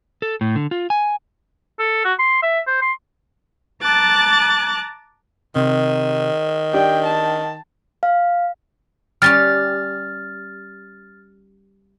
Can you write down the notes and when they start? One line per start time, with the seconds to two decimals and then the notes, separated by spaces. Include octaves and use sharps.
0.22 A4
0.41 A2
0.56 D3
0.71 F4
0.90 G#5
1.80 A4
2.05 F#4
2.19 C6
2.42 E5
2.67 C5
2.82 C6
3.82 A5 A#5 D6 F#6 A6
5.56 C3 D#3
6.74 D4 G4 D5 G5
7.06 A5
8.03 F5
9.22 G3 C#4 G4 F6 A6